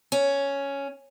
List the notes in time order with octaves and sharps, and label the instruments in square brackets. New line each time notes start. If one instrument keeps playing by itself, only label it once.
[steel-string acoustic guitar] C#4